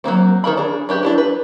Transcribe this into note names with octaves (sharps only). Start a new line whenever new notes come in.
F#3 G3 A#3 C4
D#3 F4 A#4 B5
D4 G#4
C#4 D4 G4 B4
D4 E4 G4
B4